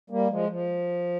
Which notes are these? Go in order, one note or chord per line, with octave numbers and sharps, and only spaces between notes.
G3 A#3
F3 G#3
F3